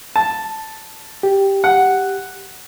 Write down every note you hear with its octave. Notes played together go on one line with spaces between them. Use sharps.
A5
G4
F#5